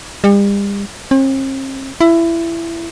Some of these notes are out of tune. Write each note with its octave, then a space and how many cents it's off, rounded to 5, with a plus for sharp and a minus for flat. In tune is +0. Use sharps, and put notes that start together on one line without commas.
G3 +40
C4 +45
E4 +20